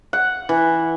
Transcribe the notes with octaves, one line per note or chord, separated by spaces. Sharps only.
F#5
E3